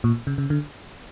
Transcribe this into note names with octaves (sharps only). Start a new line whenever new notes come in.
A#2
C#3
C#3
D3